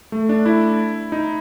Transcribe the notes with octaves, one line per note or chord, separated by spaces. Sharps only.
A3
D4
E4
D#4